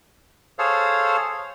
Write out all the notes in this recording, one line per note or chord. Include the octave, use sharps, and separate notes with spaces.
G#4 A4 C5 C#5 F5